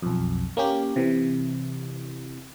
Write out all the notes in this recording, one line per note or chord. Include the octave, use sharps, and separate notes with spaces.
B1 F2
A#3 C#4 G4
C3 E3